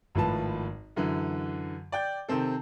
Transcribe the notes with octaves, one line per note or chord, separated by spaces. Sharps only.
G#1 A2 F3 B4 A5
F#2 D3 E3
D5 G5 G6
C3 D#3 C4 A4